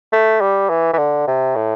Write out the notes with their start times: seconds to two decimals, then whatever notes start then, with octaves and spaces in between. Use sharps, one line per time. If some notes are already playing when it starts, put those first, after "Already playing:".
0.13 A3
0.41 G3
0.69 E3
0.93 E3
0.98 D3
1.27 C3
1.55 A2